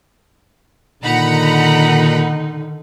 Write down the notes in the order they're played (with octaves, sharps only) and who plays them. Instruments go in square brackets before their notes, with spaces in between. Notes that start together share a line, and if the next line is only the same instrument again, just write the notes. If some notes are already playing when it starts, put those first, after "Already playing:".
[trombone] A#2 [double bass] D3 D#3 [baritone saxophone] D#4 [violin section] F#5 A#5 B5